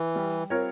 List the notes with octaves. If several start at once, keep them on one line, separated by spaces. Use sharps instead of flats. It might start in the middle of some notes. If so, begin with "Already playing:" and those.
Already playing: E3
G3
C4 F4 A#4 C#5